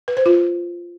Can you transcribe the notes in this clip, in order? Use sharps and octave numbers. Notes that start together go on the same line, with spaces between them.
B4
C5
F4